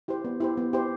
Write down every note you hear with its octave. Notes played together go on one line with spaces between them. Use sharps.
E4 G4 C5
B3
E4 G4 C5
B3
E4 G4 C5